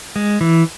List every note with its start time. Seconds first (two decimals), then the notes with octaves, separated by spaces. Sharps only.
0.16 G#3
0.41 E3